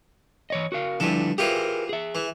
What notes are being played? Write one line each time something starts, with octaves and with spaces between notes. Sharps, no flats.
E3 C#5 D#5
F#4 A#4 F5
G2 D3 F3 E4 A4
E3 F4 G4 G#4 A#4 C5
G#4 E5
E3